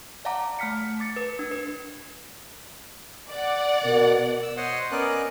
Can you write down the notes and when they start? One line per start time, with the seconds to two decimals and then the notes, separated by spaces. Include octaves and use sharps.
0.25 D5 F5 F#5 A5 A#5 D6
0.59 A3 A5 F6 B6 C#7
1.00 D6 A6 C#7
1.16 B4
1.39 D4
1.51 B4
3.30 D5 F#5
3.84 B2 A#4
4.43 E6
4.57 C5 C#5 D#5 F#5 C6
4.92 B3 C#4 A#4 D5 D#5 F#6